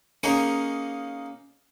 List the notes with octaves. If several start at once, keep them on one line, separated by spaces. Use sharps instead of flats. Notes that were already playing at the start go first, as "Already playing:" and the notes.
A#3 C#4 D#4 G#4 A#4